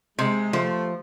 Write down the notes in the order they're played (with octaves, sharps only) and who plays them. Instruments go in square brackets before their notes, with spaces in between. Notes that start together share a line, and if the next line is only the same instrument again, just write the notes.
[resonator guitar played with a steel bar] C3 [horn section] G#3
[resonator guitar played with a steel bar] F3 [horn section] A3